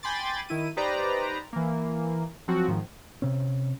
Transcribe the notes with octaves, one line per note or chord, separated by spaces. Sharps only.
G5 G#5 B5 C6 D6 A6
D#3 E4 D#7
D#4 G4 B4 C5 D5 A#5
E3 A#3
F3 F#3 C4 F#4
G#2 D#3 F3
C3 C4 C#4